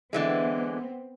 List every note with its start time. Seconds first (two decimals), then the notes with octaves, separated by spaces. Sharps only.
0.13 D3 E3 G#3 B3 C4